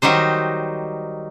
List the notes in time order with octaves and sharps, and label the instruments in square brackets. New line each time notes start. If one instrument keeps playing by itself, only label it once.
[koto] D#3 F#3 G3 D#4 C5